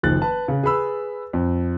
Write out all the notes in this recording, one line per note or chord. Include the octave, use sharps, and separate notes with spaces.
F#1 D#3 F3 F#6 A6
B4 A5
C#3
G#4 B4 B5 E6
F2